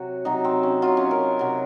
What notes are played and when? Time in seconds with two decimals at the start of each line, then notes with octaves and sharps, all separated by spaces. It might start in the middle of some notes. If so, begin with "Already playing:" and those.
Already playing: C3 F#3 F#4
0.25 C3 F#3 D#4
0.45 C4
0.63 C#4
0.82 C3 F#3 F4
0.97 C#4
1.11 A#4
1.39 C3 F#3